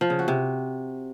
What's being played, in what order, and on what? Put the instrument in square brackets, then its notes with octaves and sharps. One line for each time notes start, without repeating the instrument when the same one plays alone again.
[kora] F3
C#3
F#4
C3